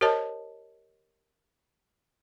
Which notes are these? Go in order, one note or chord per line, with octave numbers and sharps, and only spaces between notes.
G4 A#4 C5 C#5 D#5 A5